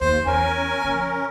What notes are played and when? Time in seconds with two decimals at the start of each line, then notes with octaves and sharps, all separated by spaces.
0.01 D#2 C5
0.26 E2 C#4 A#4 G#5
0.84 F2 C#3